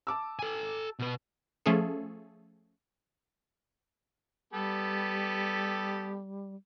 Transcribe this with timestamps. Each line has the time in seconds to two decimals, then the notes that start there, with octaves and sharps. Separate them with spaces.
0.07 A5 D6 E6
0.39 A4 G#5
0.99 B2 B4
1.66 F3 A3 C#4 G#4 A4
4.53 G3 B3 G4 A4